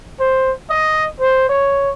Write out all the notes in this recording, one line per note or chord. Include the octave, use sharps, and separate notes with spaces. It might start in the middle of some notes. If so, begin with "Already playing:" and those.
C5
D#5
C5
C#5